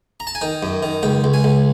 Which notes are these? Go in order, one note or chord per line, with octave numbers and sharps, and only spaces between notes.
A#5
A5
G#5
D#3 G5
F#2
D#3
C#2 G5
C#2
G#5
C#2